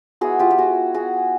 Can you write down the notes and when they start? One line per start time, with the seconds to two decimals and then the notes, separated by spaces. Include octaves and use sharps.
0.21 G#3 B3 E4 F#4 G#4
0.39 F4 G4
0.51 G4
0.58 F#4 G#4
0.94 F#4 G#4